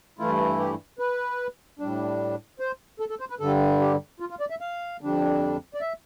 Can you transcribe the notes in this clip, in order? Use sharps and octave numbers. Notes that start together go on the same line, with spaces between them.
G2 E3 A3 E4 F4
G4
B4
A2 G3 D4
C5
A4
A4
C5
B4
G2 D3 G3 A4
G4
F4
F4
D5
E5
F5
F2 D3 G3 D4
D5
E5